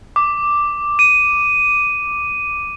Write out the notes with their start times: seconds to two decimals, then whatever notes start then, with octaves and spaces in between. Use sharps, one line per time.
0.16 D6
0.99 D#7